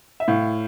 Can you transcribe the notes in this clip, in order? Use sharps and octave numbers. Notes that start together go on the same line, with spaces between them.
E5
A2 F5